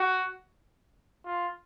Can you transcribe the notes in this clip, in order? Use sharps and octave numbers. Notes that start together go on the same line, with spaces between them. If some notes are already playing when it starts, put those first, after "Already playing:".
Already playing: F#4
F4